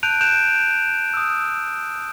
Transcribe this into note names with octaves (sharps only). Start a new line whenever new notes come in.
A5 F#6 G6 D7 D#7 F7
F#6 G6 D7 E7 F7
D#6 E6